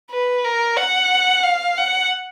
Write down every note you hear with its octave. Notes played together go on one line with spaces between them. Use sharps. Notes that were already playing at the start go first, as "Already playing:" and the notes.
B4
A#4
F#5
F5
F#5